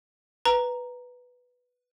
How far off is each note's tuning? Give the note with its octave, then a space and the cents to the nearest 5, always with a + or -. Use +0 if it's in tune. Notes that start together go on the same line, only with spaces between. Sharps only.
B4 +0 A#5 +0